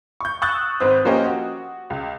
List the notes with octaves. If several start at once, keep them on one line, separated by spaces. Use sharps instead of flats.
C#6 G6
C#6 D#6 E6 F#6 G6 A6
G#1 C4 B4 C5 D#6
F3 A#3 C#4 G4 C5 D#5
F#4
C#2